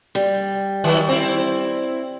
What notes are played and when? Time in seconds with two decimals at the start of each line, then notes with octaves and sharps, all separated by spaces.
0.15 G3
0.84 D#3 F#3
1.08 C4 E4